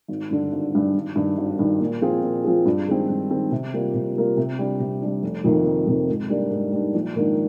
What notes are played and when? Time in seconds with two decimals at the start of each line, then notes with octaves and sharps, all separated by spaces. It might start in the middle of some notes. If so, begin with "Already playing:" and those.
0.08 G#1
0.31 G2 D3
0.52 G#1
0.73 G2 D3
0.94 G#1
1.15 G2 D#3
1.38 G#1
1.59 G2 D#3
1.80 A#2
2.01 F3 C4 F4 G#4
2.23 A#2
2.44 F3 C4 F4 G#4
2.65 G2
2.88 D#3 G#3 C4
3.09 G2
3.31 D#3 G#3 C4
3.51 C3
3.74 G3 A#3 F4
3.94 C3
4.16 G3 A#3 F4
4.37 C3
4.59 G3 D4
4.80 C3
5.02 G3 D4
5.23 F1
5.44 F2 C3 D#3 A#3
5.66 F1
5.87 F2 C3 D#3 A#3
6.09 G#2
6.30 G3 A#3 D4
6.51 G#2
6.72 G3 A#3 D4
6.94 A#1
7.15 G#2 D#3 A#3 D4